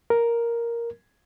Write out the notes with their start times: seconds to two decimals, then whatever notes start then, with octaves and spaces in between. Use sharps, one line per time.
0.10 A#4